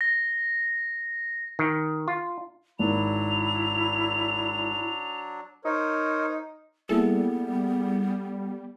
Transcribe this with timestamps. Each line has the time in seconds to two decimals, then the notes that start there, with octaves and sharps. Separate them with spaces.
0.01 A#6
1.59 D#3
2.08 F4
2.79 G#1 F#3 D4 E4 B5 F7
5.65 D#4 A#4 C5 C#5
6.89 G3 A#3 B3 E4 G#4 A4